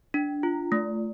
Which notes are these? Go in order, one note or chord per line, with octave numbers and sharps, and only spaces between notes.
D4
F4
A3